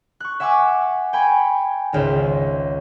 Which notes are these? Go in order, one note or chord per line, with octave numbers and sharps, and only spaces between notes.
C#6 F#6
E5 F#5 G#5 C#6 D6 E6
G5 G#5 B5 C#6 G#6
G#1 C#2 C5 E5